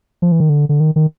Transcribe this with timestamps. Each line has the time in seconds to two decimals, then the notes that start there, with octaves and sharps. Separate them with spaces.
0.22 F3
0.32 E3
0.40 D#3
0.49 D3
0.69 D3
0.80 D#3
0.96 D#3